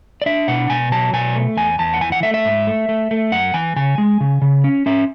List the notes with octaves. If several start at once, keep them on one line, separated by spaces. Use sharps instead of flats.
D5
D4 E5
B2 F#5
B2 G#5
F#3 A5
B2 G#5
A3
E2 G#5
E2 A5
F#5
E3 G#5
F#5
A3 E5
E5
G#2
A3
A3
A3
F#2 F#5
E3 G#5
C#3 G#5
G#3
C#3
C#3
C#4
C#4 E5